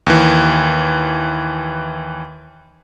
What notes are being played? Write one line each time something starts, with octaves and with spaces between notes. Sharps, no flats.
D#2 E3